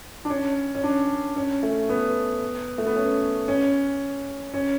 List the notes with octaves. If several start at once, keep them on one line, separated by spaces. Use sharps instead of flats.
D4
C#4
C#4
D4
C#4
A3
B3
A3
B3
C#4
C#4
C#4